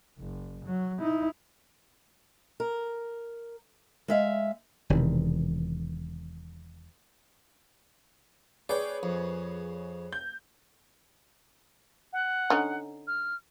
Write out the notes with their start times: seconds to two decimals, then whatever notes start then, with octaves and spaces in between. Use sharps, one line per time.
0.19 F#1
0.65 F#3
0.99 D#4 E4
2.60 A#4
4.08 G#3 E5 F5
4.90 E1 C3 D#3 E3
8.69 G#4 B4 C#5 D5 G5
9.03 F2
10.13 G6
12.13 F#5
12.50 D3 C#4 D#4
13.07 F6